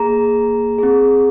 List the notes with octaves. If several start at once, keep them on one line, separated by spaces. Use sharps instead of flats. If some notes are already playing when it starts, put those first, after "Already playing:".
Already playing: A#3 G#4 A#5
C4 G#4